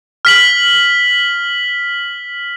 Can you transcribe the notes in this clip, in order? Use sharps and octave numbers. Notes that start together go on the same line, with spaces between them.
F6 B6 F#7